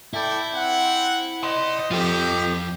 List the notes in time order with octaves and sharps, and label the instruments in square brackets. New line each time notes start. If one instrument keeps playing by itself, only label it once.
[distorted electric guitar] E4 [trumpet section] A4 D5 G5
[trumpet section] C4 F#5
[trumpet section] C5 D#5 [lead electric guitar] D5 C6
[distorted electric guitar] F2 F3 [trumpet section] C4 G4 [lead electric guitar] F4 A4